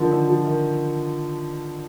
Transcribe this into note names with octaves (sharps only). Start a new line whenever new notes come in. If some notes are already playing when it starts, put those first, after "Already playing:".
Already playing: D3 D#3 F3
D3
F3
D#3